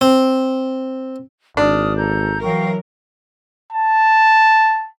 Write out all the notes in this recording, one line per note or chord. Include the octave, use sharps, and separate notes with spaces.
C4
G#1 D4 D#6 F6
A4 A#5 G6
E3 F#3 A#4 F5 G5 C#6
A5